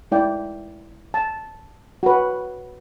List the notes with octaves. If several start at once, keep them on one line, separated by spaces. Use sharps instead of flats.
G#3 E4 D5 G5
A5
F#4 B4